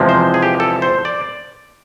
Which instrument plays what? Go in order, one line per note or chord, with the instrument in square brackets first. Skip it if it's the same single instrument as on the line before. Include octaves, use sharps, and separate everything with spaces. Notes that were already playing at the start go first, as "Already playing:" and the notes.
Already playing: [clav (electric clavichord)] E2 C3 F3 G#3
C5
G#4
G4
A4
C5
D5